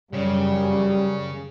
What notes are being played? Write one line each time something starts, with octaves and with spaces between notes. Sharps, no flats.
F#2 C#3 G3